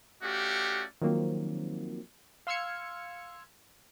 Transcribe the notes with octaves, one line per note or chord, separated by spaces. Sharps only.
A3 C#4 F#4 G4 D5 F5
D#3 F3 F#3 A#3 C4
F5 C6 E6 F6 G#6 C#7